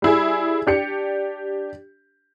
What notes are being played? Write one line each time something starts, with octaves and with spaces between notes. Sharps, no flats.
G3 E4 G#4
D4 G4 C#7